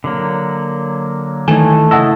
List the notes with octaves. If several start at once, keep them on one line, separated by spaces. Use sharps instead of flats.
D3 F#3 A#3
D#3 E3 A3 D#4 G#5
C#3 E4 D#5 F#5 A5 E6